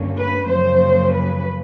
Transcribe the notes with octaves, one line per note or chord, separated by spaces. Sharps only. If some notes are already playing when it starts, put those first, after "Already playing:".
Already playing: G2 D3 G3 A#3 C#4
B4
F#2 C#3 F3 A#3 C5
B4